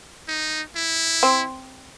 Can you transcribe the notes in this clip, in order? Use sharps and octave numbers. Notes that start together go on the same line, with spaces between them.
D#4
E4
C4